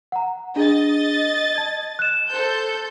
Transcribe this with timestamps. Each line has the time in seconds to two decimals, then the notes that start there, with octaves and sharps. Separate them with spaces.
0.12 F#5 A#5
0.56 D4 G#4 D#5 A6
1.56 A5 G#6
1.99 F#6 E7
2.30 A4 C5 G6